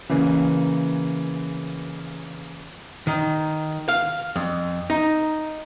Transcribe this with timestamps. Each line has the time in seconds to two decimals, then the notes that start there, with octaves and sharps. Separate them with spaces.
0.09 C#3 E3 A#3
3.07 D#3
3.88 F5
4.36 F2
4.90 D#4